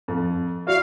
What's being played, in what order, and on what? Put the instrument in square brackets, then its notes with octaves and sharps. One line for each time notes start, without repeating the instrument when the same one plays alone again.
[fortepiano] F2
[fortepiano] E4 F#4 D5 [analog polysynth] F5